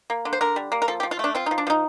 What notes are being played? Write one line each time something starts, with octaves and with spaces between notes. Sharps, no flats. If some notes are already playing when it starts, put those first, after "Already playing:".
A#3
D3
C5
D3 A#4
G3
A#3
A#4
F3 A4
G4
F3
F4
A3 D4
C4 F4
F3 D#4
D4
F3 D#4